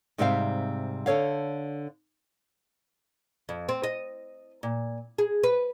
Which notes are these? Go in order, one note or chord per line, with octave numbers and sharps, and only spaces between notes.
G#2 C3 G3 C4 E5 F5
D3 A4 C#5 F5
F2
C4
D#5
A#2
G#4
B4